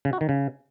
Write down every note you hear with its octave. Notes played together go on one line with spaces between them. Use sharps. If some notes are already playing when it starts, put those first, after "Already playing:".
C#3
F#4
D#3
C#3